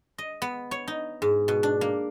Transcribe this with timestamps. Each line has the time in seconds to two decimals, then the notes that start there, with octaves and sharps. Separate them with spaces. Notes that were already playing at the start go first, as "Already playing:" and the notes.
0.18 D#5
0.42 B3
0.71 C#5
0.88 D#4
1.22 G#2
1.48 B2
1.63 D4
1.81 A#3